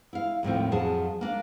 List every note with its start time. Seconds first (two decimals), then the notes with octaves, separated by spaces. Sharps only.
0.13 E4 F5
0.43 D#2 A2 F3 C4
0.72 F2 F3 F#3 G#4 A5
1.21 A#3 D4